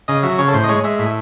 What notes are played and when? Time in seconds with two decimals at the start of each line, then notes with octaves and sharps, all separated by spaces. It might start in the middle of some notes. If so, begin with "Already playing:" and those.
0.08 C#3 D#5
0.23 F#3 E5
0.38 C#3 C#5
0.48 A4
0.54 A2 C5
0.64 D#5
0.69 G#3 C#5
0.84 G#3 E5
0.99 A2 E5